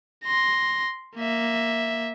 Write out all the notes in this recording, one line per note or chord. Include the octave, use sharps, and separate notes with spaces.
C6 A#6
A#3 E5